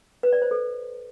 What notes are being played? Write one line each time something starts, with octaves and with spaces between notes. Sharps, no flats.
B4
D5
C5
A4